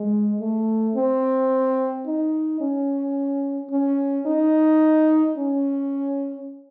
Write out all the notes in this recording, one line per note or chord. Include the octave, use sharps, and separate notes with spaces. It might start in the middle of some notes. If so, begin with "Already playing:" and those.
Already playing: G#3
A3
C4
D#4
C#4
C#4
D#4
C#4